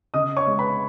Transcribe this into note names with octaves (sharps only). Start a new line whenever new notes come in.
C#3 D#5 D#6
C#5 C#6
G#3
B4 B5